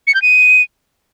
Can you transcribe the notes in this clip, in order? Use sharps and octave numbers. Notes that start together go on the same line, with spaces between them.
C#7
G6
D#7